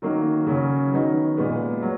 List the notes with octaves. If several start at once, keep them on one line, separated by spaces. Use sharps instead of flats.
D#3 F#3 A#3 D#4
C#3 F#3 C#4
D#3 F#3 B3 D#4 F#4
A#2 G#3 B3
F#3